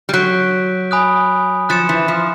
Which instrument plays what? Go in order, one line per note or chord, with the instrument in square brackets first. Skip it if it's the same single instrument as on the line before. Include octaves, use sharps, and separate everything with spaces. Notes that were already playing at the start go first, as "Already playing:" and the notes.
[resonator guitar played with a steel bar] G3
[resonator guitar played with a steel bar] F#3 [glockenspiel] G6 B6 D7
[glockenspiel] G#5 B5 D#6 F#6
[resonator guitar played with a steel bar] F3 [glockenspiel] F#6 A6 C#7 E7
[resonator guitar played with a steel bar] E3
F3